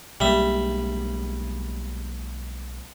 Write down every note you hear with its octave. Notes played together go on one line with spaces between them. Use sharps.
B1 G3 G#3 A#3 E5